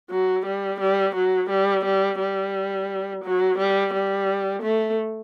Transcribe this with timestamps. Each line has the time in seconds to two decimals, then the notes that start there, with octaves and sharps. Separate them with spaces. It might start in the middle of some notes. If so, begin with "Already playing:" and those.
0.10 F#3
0.45 G3
0.80 G3
1.15 F#3
1.49 G3
1.85 G3
2.19 G3
3.24 F#3
3.58 G3
3.93 G3
4.62 A3